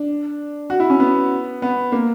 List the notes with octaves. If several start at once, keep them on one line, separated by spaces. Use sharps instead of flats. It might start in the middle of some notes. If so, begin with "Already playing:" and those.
Already playing: D4
F#4
E4
C#4
B3
B3
A#3